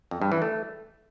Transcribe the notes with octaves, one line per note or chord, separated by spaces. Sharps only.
F2
G2
E3
A3